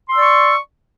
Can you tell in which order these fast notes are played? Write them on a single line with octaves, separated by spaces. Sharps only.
C6 E6 D5 C#6